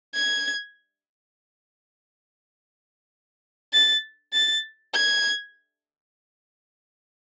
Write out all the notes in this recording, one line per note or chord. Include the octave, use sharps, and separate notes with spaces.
G#6
A6
A6
G#6